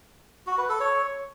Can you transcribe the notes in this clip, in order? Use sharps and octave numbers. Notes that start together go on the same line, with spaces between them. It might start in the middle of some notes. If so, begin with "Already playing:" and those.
F#4
B4
A4
C#5